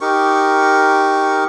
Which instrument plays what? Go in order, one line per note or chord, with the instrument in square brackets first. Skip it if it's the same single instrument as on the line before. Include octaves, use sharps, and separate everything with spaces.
[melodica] D#4 G4 A#4 C#6